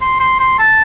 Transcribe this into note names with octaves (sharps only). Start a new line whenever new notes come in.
C6
C6
C6
A5